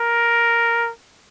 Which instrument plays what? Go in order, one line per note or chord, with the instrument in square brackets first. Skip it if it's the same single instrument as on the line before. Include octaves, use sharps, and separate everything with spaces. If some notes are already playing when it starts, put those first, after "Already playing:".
Already playing: [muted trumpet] A#4